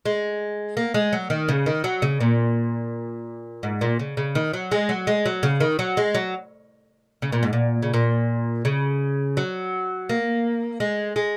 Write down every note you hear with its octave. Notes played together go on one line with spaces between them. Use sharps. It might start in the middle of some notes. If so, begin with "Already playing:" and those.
G#3
A#3
G#3
F#3
D#3
C#3
D#3
F#3
C#3
A#2
G#2
A#2
C#3
C#3
D#3
F#3
G#3
F#3
G#3
F#3
C#3
D#3
F#3
G#3
F#3
C#3
A#2
G#2
A#2
C#3
A#2
C#3
F#3
A#3
G#3
G#3